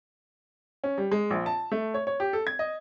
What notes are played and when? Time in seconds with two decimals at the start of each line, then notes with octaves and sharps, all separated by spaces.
0.84 C#4
0.98 G3
1.11 G#3
1.31 A#1
1.46 A5
1.71 A3
1.94 C#5
2.07 C#5
2.20 G4
2.33 A4
2.47 G#6
2.59 D#5